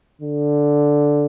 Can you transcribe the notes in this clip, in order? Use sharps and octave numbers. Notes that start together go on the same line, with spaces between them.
D3